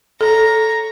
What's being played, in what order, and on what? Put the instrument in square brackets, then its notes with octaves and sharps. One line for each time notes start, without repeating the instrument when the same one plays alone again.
[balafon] A4 [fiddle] C#5 A#5